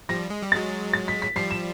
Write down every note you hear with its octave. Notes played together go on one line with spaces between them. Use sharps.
F3 G3 A#6
G#3
G3
F#3 G#3 A6
A6
B6
B6
F3 G3 C7
E7